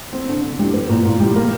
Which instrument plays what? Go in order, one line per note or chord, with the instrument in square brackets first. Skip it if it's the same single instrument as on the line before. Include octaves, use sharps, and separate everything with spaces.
[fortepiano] C4
D3
D3
G3
B3
A#2
A#2
G3
A#3